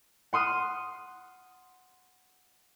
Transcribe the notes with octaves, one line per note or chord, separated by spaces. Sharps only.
F#5 C6 D#6 F6